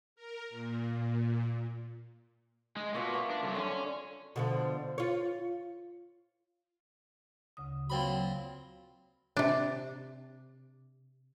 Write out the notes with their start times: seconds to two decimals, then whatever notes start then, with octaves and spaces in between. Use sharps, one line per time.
0.16 A#4
0.50 A#2
2.76 G#3
2.94 B2 A#3 F4 E5
3.13 A#4 A#5
3.30 D4
3.43 C2 F#3 A4
3.55 D3 C#4 C#6
4.36 B2 D3 F3
4.98 F4 C#5
7.57 D2 C#3 D#6
7.90 A#2 F#3 C4 B5
9.37 C3 D4